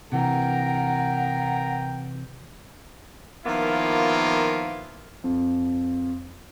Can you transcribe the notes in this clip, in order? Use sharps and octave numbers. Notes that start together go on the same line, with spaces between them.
C3 E3 A#4 F#5 G5 A#5
D#3 F3 A#3 B3 E4 F4
F2